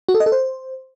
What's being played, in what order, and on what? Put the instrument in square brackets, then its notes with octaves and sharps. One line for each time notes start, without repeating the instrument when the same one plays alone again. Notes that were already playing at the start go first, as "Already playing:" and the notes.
[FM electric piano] F#4
A4
D#5
A4
C5